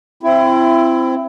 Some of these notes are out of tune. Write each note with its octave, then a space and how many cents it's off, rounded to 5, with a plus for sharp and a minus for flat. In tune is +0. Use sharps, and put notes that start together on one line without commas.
C4 +0 E4 +25